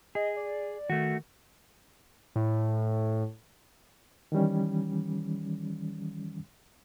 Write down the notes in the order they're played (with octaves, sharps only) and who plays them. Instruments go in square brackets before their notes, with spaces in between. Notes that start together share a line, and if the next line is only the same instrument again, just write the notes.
[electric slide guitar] G#4 [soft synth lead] D#5
[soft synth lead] D5
[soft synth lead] D#3 [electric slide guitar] A3 F#4
[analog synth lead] A2
[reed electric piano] D#3 E3 G3 C#4